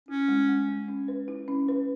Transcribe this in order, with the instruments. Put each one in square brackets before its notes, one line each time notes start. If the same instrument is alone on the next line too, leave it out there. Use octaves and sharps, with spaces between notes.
[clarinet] C#4 [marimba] E4
[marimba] G#3
G#3
G#3
C#4
B4
E4
C#4
B4